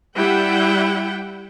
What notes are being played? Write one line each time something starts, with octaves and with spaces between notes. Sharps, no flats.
G3 E4 F#5 G5